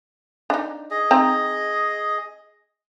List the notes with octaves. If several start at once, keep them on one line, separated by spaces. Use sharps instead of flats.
D4 D#4
G#4 D#5
C4 D#4 A#5